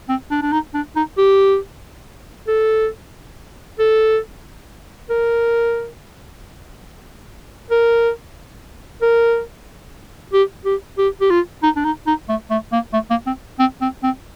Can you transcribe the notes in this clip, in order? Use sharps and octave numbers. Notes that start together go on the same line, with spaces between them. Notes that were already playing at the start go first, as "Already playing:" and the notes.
C4
D4
D4
D#4
D4
D#4
G4
A4
A4
A#4
A#4
A#4
G4
G4
G4
G4
F4
D#4
D4
D#4
D#4
A3
A3
A#3
A3
A#3
C4
C4
C4
C4